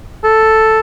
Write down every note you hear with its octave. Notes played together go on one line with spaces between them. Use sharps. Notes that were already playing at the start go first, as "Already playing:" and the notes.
A4